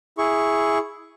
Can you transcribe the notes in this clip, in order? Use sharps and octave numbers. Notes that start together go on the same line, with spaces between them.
E4 G#4 C#6